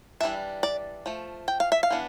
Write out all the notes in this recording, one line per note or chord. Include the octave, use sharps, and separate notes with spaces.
E3 G3 D4 E5
D5
F3 A3
G5
F5
E5
F5
E3 B3 D4